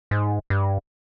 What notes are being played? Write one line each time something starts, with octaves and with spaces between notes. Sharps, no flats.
G#2
G2